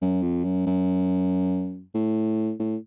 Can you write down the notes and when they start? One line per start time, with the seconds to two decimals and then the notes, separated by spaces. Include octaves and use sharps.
0.02 F#2
0.22 F2
0.44 F#2
0.66 F#2
1.94 A2
2.59 A2